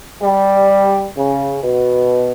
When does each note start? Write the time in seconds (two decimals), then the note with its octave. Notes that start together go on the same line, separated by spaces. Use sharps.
0.22 G3
1.16 C#3
1.63 B2